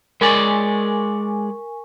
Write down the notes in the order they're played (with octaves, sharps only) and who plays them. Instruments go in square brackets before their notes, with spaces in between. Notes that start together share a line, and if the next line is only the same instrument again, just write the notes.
[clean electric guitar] G#3 C#5 D5 [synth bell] A#4 G#5 C#6